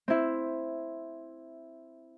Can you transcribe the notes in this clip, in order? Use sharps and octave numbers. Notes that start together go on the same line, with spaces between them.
C4 E4